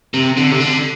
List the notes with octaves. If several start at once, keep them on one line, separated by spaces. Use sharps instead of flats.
C3
D3
C3
D3